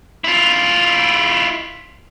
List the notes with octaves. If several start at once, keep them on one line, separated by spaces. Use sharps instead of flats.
E4 F4